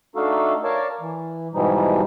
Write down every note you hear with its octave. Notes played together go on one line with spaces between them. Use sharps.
A3 D4 D#4 F#4 A4 F5
A#4 C#5 D5 F5 A5
E3
G#2 B2 E3 F3 G3 D#4